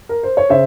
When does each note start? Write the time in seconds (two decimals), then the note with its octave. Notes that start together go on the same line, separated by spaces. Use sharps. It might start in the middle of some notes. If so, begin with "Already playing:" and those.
0.09 A#4
0.23 C5
0.37 C#5
0.49 C#3 C5 E5